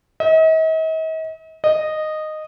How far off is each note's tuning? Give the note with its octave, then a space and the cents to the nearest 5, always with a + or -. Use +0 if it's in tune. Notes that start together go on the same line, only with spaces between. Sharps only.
D#5 +45
D#5 -10